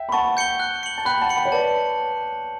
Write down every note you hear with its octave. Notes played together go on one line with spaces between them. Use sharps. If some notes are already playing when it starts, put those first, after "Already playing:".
Already playing: E5 G5
B5
F#5 A5 C#6
G6 C#7 G7
F#6
C#7 F#7
A5
G5 B5 F#6
F#5 A5
C#7 F#7
G5 B5
C#5
B4 D5 A5